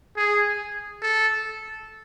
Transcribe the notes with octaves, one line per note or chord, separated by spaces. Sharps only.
G#4
A4